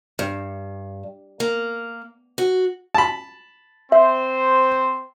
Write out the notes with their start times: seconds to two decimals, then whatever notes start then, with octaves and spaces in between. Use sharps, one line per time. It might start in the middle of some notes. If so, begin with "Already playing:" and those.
0.19 G2
1.40 A#3
2.38 F#4
2.95 A5 B5
3.92 C4 C5 E5